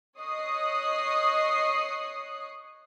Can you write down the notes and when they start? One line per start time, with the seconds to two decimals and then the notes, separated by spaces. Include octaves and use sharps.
0.19 C#5 D#5 C#6 D#6 F#6 C7